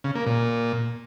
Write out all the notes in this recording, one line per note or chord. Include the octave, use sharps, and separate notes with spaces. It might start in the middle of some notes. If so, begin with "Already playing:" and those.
C#3
A#3
A#2